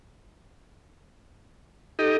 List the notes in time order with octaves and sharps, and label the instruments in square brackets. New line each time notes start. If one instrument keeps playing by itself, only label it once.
[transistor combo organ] D#4 G4 D#5 [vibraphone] A4